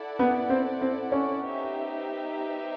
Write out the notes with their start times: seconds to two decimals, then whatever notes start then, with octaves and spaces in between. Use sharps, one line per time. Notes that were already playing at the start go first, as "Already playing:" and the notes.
Already playing: E4 A4 D5 F#5
0.19 B3
0.50 C4
0.81 C4
1.12 C#4
1.42 B3 D#4 G4 C5 E5